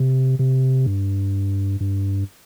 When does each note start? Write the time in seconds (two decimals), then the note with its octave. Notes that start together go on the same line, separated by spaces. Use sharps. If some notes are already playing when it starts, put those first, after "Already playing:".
Already playing: C3
0.39 C3
0.86 G2
1.80 G2